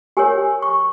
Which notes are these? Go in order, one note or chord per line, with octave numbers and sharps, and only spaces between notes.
G4 A#4 C#5 G#5
C#6